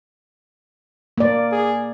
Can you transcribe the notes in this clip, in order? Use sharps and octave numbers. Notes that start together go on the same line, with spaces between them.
A#3 D5
G#4